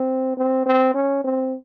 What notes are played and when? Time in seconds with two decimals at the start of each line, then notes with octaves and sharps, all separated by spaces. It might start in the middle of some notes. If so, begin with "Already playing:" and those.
Already playing: C4
0.37 C4
0.66 C4
0.94 C#4
1.24 C4